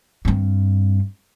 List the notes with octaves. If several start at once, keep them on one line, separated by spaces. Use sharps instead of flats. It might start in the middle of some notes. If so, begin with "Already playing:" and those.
G2 C4